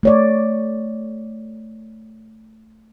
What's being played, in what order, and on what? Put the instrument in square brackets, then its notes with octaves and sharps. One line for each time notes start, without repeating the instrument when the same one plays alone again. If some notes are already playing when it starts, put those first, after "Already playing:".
[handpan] A3 C#5 D5